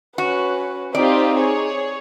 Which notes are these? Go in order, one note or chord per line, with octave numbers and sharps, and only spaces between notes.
C#4 F#4 B4
C4 D#4 F4 G4 D5
G#4 C#5